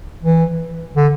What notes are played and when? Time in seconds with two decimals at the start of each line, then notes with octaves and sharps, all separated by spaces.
0.23 E3
0.96 D3